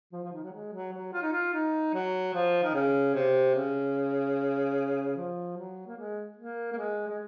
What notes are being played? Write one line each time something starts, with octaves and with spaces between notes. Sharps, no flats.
F3
F3
D#3
F#3
G#3
F#3
F#3
F4
D#4
F4
D#4
F#3
F3
D#3
C#3
C3
C#3
F3
F#3
A#3
G#3
A#3
A#3
G#3
G#3